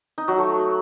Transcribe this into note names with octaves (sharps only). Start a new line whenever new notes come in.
D#4
F#3
A3